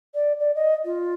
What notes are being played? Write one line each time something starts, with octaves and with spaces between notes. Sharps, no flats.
D5
D5
D#5
F4